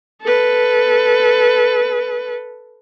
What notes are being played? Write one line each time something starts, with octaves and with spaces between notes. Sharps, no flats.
A4 B4